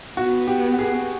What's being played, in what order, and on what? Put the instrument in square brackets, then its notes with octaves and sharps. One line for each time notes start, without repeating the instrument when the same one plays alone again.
[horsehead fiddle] B3 [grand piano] F#4
[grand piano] G4
G#4